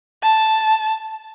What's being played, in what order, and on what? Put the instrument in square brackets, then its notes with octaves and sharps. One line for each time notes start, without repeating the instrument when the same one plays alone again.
[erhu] A5